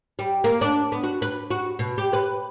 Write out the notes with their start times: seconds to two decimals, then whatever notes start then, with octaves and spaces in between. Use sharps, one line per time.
0.19 G3
0.44 A#3
0.61 D4
0.92 B3
1.04 F#4
1.22 B4
1.51 F#4
1.79 B2
1.98 G4
2.13 B4